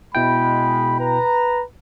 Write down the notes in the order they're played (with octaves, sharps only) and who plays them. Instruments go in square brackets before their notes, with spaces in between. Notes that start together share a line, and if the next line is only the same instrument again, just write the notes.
[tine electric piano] B2 E4 G5 [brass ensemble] G#3 [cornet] B5
[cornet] B4 [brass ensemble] A#5